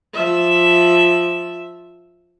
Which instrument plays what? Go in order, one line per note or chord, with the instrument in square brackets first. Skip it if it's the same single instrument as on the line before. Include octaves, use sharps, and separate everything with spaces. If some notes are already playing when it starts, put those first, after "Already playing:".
[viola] F3 E5